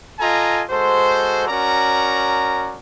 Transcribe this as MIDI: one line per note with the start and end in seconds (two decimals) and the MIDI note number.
0.20 0.62 65
0.20 0.62 69
0.20 0.62 75
0.20 0.62 80
0.20 0.62 82
0.70 1.46 56
0.70 1.46 66
0.70 1.46 69
0.70 1.46 72
1.48 2.79 61
1.48 2.79 66
1.48 2.79 70
1.48 2.79 74
1.48 2.79 82